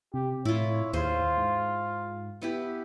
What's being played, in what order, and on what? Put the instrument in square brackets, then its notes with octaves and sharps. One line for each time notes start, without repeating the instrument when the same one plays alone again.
[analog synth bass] C3 [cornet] G4
[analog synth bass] A2 [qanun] E4 F4 [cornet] C#5
[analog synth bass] D#2 [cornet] F4 [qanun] G#4 C5
[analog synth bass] G#2
[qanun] B3 E4 G4